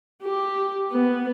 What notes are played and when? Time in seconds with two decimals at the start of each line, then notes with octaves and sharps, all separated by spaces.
0.22 G4
0.92 B3